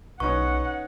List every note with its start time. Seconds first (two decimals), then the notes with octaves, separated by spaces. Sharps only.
0.20 B1 C#4 D#4 B4 F#5 C#6